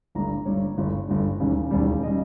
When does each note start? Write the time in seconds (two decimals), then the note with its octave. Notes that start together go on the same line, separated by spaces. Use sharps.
0.15 G1 G2 G3 A#5
0.45 G1 G2 G3 C#5
0.77 G1 G2 G3
1.08 G1 G2 G3
1.40 E1 D#2 C#3 G3
1.71 E1 D#2 C#3 G3
2.03 C#3 G3 D#5